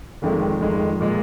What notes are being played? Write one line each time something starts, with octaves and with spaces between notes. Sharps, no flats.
F1 F2 D#3 G#3
F1 F2 D#3 G#3
A#2 G#3